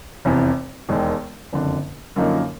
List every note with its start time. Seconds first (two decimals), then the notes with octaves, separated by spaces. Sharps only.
0.25 F1 E2 C3
0.89 E1 D#2 D#3 G#3
1.53 F#1 F2 D3
2.16 F#2 D3 F3 A#3 D#4